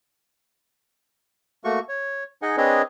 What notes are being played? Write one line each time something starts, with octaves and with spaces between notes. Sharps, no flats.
A3 A#3 F#4 C#6
C#5
D#4 G#4 D#5 F#5 G#5
C4 D4 G#4 B4 C#5 D#5